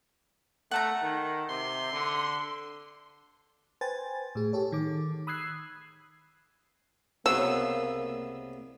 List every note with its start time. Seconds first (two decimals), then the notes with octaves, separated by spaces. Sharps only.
0.71 A3 F#5 A5 A#5
1.02 D#3
1.49 C3 C6
1.92 D3
3.81 B4 C5 G5 G#5 A6
4.35 A2 G#4
4.53 G4 A4 C#5
4.72 D#3 D6
5.27 B5 D#6 E6 F#6 G#6 C7
7.26 C2 C#3 F#3 A#3 B3 C#5 E6